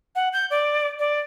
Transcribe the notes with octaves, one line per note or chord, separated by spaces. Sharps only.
F#5
G6
D5
D5